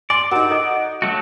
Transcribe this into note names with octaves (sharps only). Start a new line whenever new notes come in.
D5 G#5 C6
D#4 F#4 A#4 A#5
A4 D#5 A#5
F#3 A3 F#4